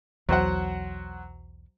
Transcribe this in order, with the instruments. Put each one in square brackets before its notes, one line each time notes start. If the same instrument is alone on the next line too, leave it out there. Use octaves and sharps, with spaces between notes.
[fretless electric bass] B1 E2 E3 [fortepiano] F#3 C5 F#5